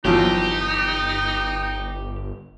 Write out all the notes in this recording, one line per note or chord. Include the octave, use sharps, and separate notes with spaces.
G1 E2 F3 F#3 D#4 G4